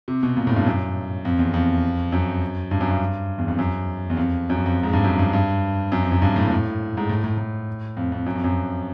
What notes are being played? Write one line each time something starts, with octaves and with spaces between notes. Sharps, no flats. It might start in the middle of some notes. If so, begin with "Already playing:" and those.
C3
B2
A#2
A2
G2
F#2
F2
E2
F2
F#2
G2
F#2
G2
E2
F2
F#2
E2
F2
F#2
F2
F2
G#2
G2
F#2
G2
G2
F#2
F2
F#2
G2
A2
A#2
A2
G#2
A2
A2
A2
F2
F2
F#2
F2
F#2